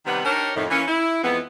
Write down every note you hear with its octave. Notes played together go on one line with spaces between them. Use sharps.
C3 D#3 G3 B3 B4 F#5
D4 D#4 G4 A#4 C#5
F2 A2 D#3
E3 A#3 C#4
E4
F2 E3 G#3 B3